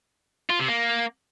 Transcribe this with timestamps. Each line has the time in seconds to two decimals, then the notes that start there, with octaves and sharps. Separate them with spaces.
0.50 F4
0.59 C3
0.68 A#3